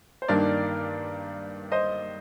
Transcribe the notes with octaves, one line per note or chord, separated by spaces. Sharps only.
C5
G2 D#3 A#3 D4 A#4 D5
C5 D#5